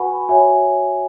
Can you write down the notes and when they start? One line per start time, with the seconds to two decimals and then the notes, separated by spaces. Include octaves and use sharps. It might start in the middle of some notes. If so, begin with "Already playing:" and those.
Already playing: F#4 B4 F#5 G#5 B5 C#6
0.29 F#4 C#5 E5 G#5